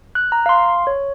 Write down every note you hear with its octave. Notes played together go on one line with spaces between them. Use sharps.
F#6
A#5
F5 C6
C#5